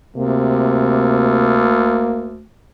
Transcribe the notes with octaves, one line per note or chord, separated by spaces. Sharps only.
D2 C3 A#3